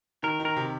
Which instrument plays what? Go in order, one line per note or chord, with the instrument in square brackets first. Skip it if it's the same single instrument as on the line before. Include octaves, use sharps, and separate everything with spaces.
[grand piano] D#3 [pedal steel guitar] A#4
[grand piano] D#3
[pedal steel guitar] A#4
[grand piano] C3